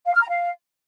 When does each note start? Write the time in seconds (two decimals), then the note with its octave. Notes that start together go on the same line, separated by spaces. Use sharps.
0.06 F5
0.14 F6
0.22 A#5
0.29 F5